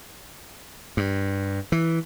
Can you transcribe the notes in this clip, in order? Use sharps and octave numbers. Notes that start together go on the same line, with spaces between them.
G2
E3